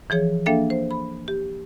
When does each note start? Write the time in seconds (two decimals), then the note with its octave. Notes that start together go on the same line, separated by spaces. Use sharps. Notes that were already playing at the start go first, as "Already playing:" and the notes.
0.10 E3 F3 G#4 C#5
0.46 A#3 D4 A4 E5 F5 G5
0.70 C5
0.91 B5
1.28 G4